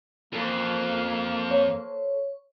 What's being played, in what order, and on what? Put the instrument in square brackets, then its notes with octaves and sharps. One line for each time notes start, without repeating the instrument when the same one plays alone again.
[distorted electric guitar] F2 [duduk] A#3 [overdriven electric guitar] A4 C5
[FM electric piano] C#5